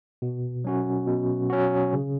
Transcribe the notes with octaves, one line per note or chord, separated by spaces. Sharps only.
B2
F#3 C#4 F#4
B2
F#3 C#4 F#4
C#3